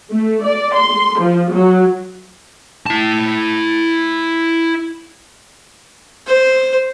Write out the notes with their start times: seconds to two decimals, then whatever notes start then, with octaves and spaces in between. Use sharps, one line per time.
0.11 A3
0.46 D5
0.75 C6
1.20 F3
1.52 F#3
2.86 E4 A5
6.26 C5